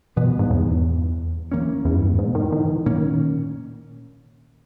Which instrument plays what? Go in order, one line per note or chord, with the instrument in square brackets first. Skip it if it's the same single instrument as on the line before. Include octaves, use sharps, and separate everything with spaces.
[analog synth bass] B2 [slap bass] E3 G3 B3
[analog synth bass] G#2
E2
[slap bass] E3 A#3 C#4
[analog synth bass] E2
G2
G#2
G#2
B2
D#3
E3
D#3
E3
D#3
[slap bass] A#2 A#3 C#4